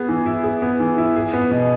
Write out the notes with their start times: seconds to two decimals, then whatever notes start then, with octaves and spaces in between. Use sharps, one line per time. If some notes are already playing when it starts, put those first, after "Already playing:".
Already playing: B3 G#4
0.08 E3
0.26 E4
0.44 G#4
0.62 B3
0.80 E3
0.98 E4
1.16 G#4
1.33 B3
1.51 B2